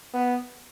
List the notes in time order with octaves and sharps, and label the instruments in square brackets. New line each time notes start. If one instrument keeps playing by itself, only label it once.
[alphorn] B3